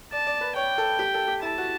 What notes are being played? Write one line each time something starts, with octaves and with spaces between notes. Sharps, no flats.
D5 A5
D5
B4
C#5 G5
A4
G4
A4
G4
E4 A5
F#4